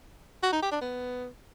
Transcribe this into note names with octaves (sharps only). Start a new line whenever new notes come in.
F#4
D#4
G4
D4
B3